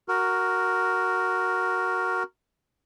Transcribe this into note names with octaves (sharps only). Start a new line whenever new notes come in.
F#4 A#4